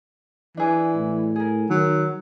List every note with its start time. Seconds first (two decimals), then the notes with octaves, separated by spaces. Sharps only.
0.57 E3 D4 G#4 D5
0.95 A2
1.36 G#4 A#4
1.70 D#3 F#3